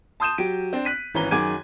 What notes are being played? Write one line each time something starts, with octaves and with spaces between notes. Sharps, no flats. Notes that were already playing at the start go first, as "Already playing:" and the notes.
A5 C6 D#6 G6 D#7 E7
F#3 G4 D7
C4 D4 D5
F#6 B6 D#7
G#1 E3 C#4 B4 A#5 G7
F#2 D#3 G#4 D6 G#6 D#7